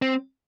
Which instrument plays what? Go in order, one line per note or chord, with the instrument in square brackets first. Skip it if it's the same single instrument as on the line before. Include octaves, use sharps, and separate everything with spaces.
[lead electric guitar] C4